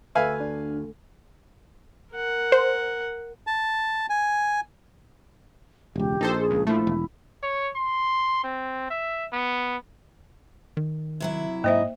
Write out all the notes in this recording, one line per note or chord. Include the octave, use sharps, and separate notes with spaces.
D2 B4 E5 F5 G#5
D4
A#4 F#5
C5
A5
G#5
E1 C#2 G4
A#1 D#4 A4 C5
G#4
C#2
F3 A3 E4
E1
C#5
C6
C4
E5
B3
D#3
C3 F#3 E4
G#2 A#3 C5 D#5 E5